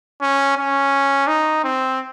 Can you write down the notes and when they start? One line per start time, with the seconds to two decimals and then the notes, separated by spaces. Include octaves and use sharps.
0.21 C#4
0.58 C#4
1.28 D#4
1.64 C4